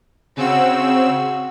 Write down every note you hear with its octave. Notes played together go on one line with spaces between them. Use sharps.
C#3 C4 F#4 E6